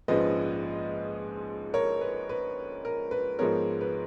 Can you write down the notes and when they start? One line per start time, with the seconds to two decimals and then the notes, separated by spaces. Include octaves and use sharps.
0.08 A#1 G#2 F3 G#3 C#4 B4 D#5
1.74 A#4 C#5
2.01 B4
2.29 B4
2.85 A#4
3.11 B4
3.39 G#2 F3 G#3 B3 A#4 C#5
3.81 B4